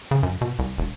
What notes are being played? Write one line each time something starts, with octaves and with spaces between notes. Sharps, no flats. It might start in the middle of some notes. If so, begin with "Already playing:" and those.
C#3
F#2
B2
C2
E1